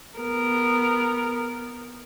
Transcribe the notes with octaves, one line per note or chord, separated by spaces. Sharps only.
B3 A#4